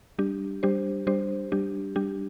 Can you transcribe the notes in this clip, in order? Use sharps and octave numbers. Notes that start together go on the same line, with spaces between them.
G3 D4 G4
G3 D4 G4 C5
G3 D4 G4 C5
G3 D4 G4
G3 D4 G4